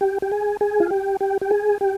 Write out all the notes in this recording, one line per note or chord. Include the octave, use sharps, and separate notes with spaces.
G4
G4
G#4
G#4
F4
G4
G4
G4
G#4
G4